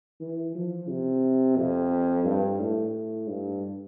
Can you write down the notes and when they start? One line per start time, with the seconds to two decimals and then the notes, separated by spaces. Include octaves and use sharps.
0.21 E3
0.55 F3
0.89 C3
1.57 F2
2.25 G2
2.60 A2
3.28 G2